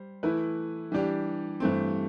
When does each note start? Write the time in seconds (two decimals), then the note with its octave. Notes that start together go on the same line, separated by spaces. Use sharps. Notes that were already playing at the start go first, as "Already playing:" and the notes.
Already playing: G3 C5
0.23 E3 A3 E4 B4
0.92 E3 G3 D4 G4
1.60 G2 E3 A3 C4